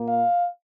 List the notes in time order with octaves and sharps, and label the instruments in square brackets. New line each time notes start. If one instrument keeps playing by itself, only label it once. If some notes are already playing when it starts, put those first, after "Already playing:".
Already playing: [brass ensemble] A#2 A#3
F5